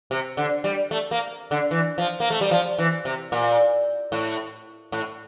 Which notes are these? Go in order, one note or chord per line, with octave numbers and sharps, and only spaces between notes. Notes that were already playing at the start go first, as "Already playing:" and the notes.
C3
D3
G3
A3
A#3
D3
E3
F3
A#3
A3
G3
F3
E3
C3
A#2
A2
A2